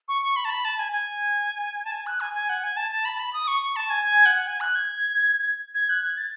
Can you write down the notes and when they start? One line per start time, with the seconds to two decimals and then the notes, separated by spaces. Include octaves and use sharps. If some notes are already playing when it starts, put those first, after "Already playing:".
0.08 C#6
0.23 C#6
0.36 B5
0.45 A5
0.50 B5
0.65 A5
0.79 G#5
0.92 G#5
1.85 A5
1.92 G#5
2.07 F#6
2.21 G#5
2.34 G#5
2.49 F#5
2.64 G#5
2.77 A5
2.91 A5
3.05 B5
3.15 A5
3.19 B5
3.33 D#6
3.48 C#6
3.62 C#6
3.76 A5
3.90 G#5
4.05 G#5
4.26 F#5
4.48 G#5
4.61 F#6
4.75 G#6
5.75 G#6
5.89 F#6
6.03 G#6
6.17 A6